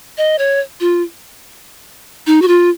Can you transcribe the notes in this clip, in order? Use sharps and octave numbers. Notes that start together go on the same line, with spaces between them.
D#5
C#5
F4
D#4
F#4
F4